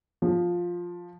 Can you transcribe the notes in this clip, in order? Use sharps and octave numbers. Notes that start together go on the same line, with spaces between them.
F3